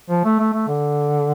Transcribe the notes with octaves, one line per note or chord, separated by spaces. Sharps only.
F3
A3
A3
A3
D3